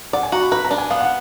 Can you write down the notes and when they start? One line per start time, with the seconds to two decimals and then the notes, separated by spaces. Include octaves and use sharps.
0.13 D5 F#5
0.23 G#5
0.32 F#4 A#5
0.42 B5
0.52 B4 A#5
0.64 A#5
0.71 D4
0.78 G#5
0.90 B3 F5
1.01 F#5